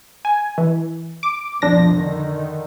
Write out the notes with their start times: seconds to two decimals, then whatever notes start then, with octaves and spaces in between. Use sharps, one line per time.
0.25 G#5
0.58 E3
1.23 D6
1.62 C2 F2 B2 F3 D4 A#6
1.93 D3 D#3